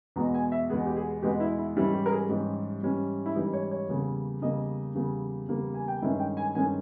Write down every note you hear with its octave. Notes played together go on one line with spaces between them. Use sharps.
E2 B2 G#3 B3 A#5
G#5
E5
E2 B2 G#3 B3 G#4
G4
G#4
E2 B2 G#3 B3 G4
E4
E4
G#2 E3 G3 C#4 E4
G4
A#4
G#4
G#2 E3 G3 C#4 G4
G#2 E3 G3 C#4
E4
G#2 E3 G3 C#4 D#4
C#5
C#5
E2 C#3 G3 A#3
E2 C#3 G3 A#3 D#5
E2 C#3 G3 A#3
E2 C#3 G3 A#3
G#5
G5
G2 D#3 G#3 C#4 E5
G5
G#5
G2 D#3 G#3 C#4 G#5